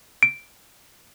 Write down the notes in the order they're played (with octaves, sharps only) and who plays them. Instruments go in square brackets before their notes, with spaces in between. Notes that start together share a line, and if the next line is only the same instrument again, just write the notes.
[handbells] D7